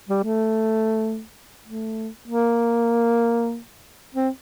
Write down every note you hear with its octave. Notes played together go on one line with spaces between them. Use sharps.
G3
A3
A3
A#3
C4